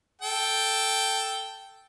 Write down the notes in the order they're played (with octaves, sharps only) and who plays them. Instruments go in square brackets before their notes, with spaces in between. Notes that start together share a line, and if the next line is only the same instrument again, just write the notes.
[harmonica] A4 G5